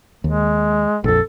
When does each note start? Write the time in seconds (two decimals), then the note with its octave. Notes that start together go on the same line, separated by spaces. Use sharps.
0.24 D#2 G#3
1.04 A#1 F2 A4